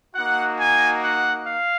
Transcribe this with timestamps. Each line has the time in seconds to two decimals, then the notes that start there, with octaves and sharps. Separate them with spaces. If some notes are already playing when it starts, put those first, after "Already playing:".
0.15 A#3 D#4 F#4 F#5
0.59 G#5
1.03 F#5
1.46 F5